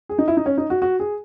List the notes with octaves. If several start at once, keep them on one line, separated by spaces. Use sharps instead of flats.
G#4
D#4
E4
D#4
C#4
D#4
F#4
F#4
G#4